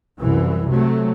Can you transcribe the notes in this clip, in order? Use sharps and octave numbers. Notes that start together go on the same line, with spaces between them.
C2 F#2 E3
C3 F#3 A3